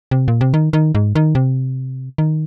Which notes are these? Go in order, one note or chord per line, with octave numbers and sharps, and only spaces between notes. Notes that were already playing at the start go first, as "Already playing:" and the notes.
C3
A#2
C3
D#3
D#3
G#2
D#3
C3
D#3